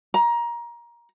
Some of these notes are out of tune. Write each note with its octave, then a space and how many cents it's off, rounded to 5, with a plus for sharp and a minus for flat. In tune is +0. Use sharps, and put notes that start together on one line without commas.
A#5 +20